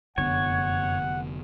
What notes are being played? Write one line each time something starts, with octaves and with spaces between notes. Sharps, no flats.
F1 F#2 D3 B3 C#5 F#5